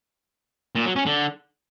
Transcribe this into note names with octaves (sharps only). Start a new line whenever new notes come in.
A#2
F#3
C#4
D3